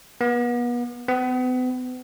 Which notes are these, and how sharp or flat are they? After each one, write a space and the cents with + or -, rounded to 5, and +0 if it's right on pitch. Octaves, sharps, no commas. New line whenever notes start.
B3 -35
B3 +40